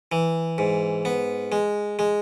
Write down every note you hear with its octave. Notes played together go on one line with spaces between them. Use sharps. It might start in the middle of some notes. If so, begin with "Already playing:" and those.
E3
G#2
B3
G#3
G#3